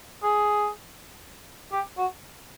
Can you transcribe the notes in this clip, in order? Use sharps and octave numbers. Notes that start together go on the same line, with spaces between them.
G#4
G4
F#4